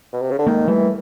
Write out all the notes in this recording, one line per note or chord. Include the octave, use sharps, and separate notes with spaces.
B2
C3
C#3
D3
D#3 G#3 A#3
E3 G3 A3